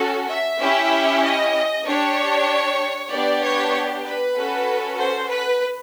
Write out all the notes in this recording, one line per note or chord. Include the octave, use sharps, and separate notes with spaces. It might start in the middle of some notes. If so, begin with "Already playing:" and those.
Already playing: C#4 F#4 A4
E5
C#4 E4 G4
D#5
D4 G4 C#5
B3 D4 G4 D5
C#5
B4
C#4 F#4 A4
C5
B4